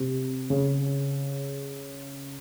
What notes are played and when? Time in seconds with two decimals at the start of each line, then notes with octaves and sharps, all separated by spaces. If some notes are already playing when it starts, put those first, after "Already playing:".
Already playing: C3
0.50 C#3